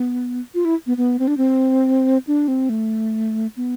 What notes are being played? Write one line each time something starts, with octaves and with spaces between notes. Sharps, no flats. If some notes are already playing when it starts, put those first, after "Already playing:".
Already playing: B3
F4
E4
B3
B3
C4
D4
C4
D4
C4
A3
B3